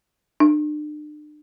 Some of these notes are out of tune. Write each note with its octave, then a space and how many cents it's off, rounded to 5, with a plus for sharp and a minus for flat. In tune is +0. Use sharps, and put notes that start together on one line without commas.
D4 +40